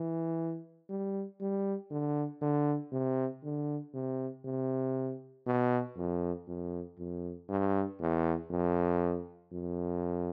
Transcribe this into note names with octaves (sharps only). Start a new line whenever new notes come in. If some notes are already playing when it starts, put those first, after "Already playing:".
Already playing: E3
G3
G3
D3
D3
C3
D3
C3
C3
B2
F2
F2
F2
G2
E2
F2
F2